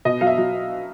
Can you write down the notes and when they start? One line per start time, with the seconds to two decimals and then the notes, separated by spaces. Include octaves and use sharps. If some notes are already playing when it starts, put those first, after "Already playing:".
0.05 B2 D#5
0.21 F#3 F5
0.27 E5
0.38 F#3